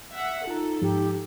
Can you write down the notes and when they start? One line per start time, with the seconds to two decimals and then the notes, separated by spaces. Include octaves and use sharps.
0.16 E5 F#5
0.47 D#4 F4 A4 A#5
0.81 G#2 F3 G4